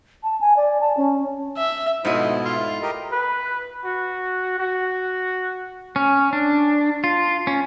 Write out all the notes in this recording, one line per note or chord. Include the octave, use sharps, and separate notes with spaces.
A5
G#5
D5
A5
C#4
E5
G#2 B2 F3 A3 E4 D#5
F4
G4 A#4 D#5
B4
F#4
F#4
C#4
D4
F4
C#4